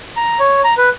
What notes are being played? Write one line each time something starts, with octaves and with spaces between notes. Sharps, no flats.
A#5
C#5
A#5
B4